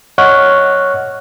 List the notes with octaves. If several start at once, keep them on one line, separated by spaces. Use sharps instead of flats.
C#5 D#5 F#5 C#6 F6 F#6